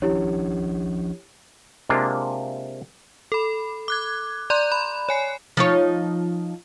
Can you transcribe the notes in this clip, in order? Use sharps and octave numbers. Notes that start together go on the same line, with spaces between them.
F3 C#4 D4 E4 G4 C#5
C3 G#3 A#3 D4 F4
A4 B5
D6 F#6 G#6
D5 A#5 C6 F#6
B5
C#5 G#5 C7
F3 D#4 C#5